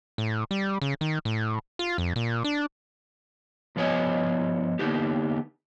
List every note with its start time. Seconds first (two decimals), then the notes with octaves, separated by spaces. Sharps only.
0.18 A2
0.51 G3
0.82 C#3
1.01 D#3
1.25 A2
1.79 F4
1.98 F2
2.16 A#2
2.44 D4
3.76 G2 F3 B3 C#5 D#5 G#5
4.79 D3 A#3 B3 D#4 G4